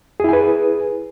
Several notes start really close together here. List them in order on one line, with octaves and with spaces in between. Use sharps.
G#4 E4 G#5 B4